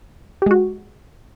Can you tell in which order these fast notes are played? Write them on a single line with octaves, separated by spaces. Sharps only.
G4 G#3 F#4